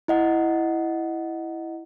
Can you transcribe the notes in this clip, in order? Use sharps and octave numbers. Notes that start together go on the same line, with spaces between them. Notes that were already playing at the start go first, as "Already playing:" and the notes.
E4 D#5 F#5